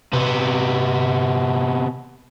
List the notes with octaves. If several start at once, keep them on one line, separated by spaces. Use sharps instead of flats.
C3 B3